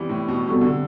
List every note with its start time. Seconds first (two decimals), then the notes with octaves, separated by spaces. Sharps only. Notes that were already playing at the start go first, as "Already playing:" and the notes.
Already playing: E3 G3 B3 C4
0.10 A2
0.28 B2
0.47 C3 G3 B3 F#4 A4
0.61 D3